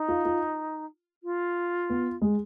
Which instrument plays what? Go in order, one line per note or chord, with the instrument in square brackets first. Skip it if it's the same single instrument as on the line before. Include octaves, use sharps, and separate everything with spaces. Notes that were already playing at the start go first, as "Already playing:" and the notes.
Already playing: [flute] D#4
[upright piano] F4
F4
[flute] F4
[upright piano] B3
G#3